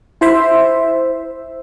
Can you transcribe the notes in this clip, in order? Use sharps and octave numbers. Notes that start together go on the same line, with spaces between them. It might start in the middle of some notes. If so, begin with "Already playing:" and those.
E4 C5 E5